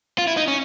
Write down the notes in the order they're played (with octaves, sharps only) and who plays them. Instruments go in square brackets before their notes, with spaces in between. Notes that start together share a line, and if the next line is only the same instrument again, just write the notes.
[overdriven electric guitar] F4
E4
D#4
C#4